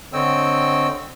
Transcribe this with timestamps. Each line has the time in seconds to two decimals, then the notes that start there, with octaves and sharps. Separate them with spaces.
0.13 D3 C4 C#5 D#5 G5 E6